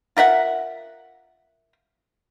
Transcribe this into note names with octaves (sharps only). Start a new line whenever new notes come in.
F4 A#4 E5 F#5